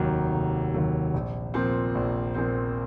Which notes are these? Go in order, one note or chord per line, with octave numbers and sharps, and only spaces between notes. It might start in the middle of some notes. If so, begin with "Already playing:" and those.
Already playing: F1 D#2 D#3 F#3
F1
D#2 D#3 F#3
A#1
A#2 F3 C4
A#1
A#2 F3 C4